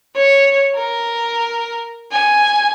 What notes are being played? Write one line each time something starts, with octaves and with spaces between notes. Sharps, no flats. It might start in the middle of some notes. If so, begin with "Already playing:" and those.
C#5
A#4
G#5